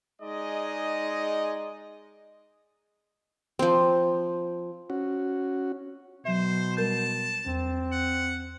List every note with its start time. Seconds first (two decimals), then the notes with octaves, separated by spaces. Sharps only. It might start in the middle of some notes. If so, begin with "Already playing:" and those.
0.22 G#3 D#4 G#4 D5 D#5
3.59 F3 C4
4.90 C#4 F#4
6.25 B2 F#3 C5 E5
6.77 G3 A#4 A5 G6
7.46 E2 C4
7.92 F#5